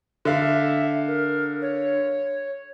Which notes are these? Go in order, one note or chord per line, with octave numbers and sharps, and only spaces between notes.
D3 E5 F5
A#4
C#5